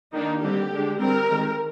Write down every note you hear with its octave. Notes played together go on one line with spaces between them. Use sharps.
D#3 A#3 D4 D#4
D3 G3 C4 G4
D3 G#3 D4
D3 G3 C4 A#4
D#3 G#3 C4